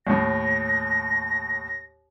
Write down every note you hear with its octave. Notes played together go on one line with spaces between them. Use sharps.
D#2 A2 A#6